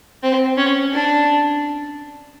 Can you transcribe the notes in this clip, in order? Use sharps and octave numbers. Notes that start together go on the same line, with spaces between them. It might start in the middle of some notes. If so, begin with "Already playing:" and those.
C4
C#4
D4